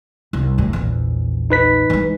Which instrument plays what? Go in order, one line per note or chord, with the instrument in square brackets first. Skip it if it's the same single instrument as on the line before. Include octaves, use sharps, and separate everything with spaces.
[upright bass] C2
D2 A2
A#1 E2
[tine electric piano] D#4 B4 B6
[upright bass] E3 G#3